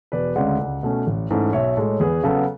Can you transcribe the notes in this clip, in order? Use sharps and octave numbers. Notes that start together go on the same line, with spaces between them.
E1 B4 D5
D2 C#3 G#3 D5 F#5
C#2
B2 A3 C#4
A1
G#2 E3 A3 C#4
B1 C#5 E5
A2 G#3 A4 C#5
E2 G#4 B4
C#3 F#3 B3 A4